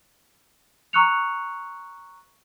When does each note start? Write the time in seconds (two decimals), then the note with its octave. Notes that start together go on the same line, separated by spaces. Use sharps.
0.93 A#5 C#6 E6 F#6 C#7 F7